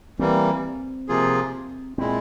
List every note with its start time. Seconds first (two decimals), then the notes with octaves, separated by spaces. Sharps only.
0.19 E3 G3 A#3 C4
1.09 C3 F3 A#3 F4 G#4
1.98 A#2 G#3 C4 E4